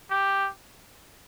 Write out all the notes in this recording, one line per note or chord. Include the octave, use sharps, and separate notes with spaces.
G4